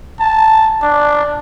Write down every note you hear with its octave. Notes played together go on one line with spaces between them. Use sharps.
A5
D4